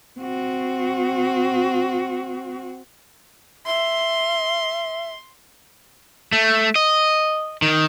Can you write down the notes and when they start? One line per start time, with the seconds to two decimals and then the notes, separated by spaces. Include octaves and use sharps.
0.20 C4 F#4
3.66 E5 C6
6.32 A3
6.75 D#5
7.62 D#3